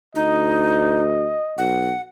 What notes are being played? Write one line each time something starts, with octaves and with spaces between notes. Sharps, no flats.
D2 D#4 D#5
B1 F#5